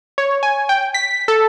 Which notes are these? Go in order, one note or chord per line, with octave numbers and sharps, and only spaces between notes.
C#5
G#5
G5
B6
A4